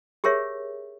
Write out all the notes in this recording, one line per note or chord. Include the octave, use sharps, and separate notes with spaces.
G4 G#4 A#4 C#5 E5